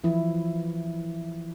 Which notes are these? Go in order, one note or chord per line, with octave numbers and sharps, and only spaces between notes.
E3 F3 E4